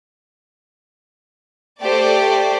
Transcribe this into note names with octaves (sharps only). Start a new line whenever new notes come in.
A3 G4 C5 D5